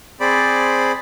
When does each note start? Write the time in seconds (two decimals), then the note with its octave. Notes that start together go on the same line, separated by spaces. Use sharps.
0.20 C4 G#4 C5 D5 B5 D6